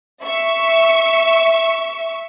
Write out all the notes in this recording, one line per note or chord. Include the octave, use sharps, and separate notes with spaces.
E5 C#6